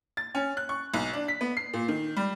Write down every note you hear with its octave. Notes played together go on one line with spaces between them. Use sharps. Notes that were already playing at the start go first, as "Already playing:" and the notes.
A6
C#4
F#6
C#6
B1
D4
B6
B3
C7
A#2
D#3
G3